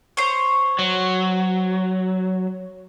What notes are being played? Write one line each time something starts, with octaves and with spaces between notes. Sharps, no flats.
C5 C#5
F#3